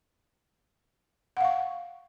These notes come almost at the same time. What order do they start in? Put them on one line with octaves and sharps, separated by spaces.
F#5 F5 C#6